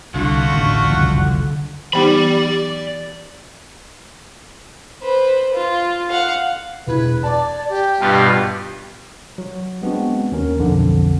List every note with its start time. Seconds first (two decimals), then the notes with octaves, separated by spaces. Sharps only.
0.14 C2 D3 A3 F4 F#4
0.52 A1 D#2
0.84 F#1 C2 F2
1.93 E3 B3 D#4 G4 D5 B5
5.02 B4 C5
5.54 F4
6.10 F5 F#5
6.87 E1 E4 B4 G#6
7.23 D5 A5 D6
7.69 G4
8.00 G2 B2 F4 A5 F#6
9.38 F#3
9.82 G#3 B3 C4 D4 F#4
10.32 D#2 C#4 A#4
10.59 B1 F2 D3